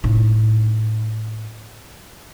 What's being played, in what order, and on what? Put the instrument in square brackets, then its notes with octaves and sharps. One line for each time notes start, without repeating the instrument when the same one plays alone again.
[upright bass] A2 D#4